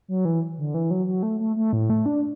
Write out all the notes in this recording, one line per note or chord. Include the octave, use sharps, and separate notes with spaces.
F#3
E3
D3
E3
F#3
F#3
A3
A3
A3
A2
A3
D4